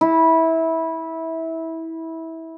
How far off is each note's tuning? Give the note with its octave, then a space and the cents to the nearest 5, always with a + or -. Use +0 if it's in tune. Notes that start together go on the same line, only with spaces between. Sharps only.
E4 -20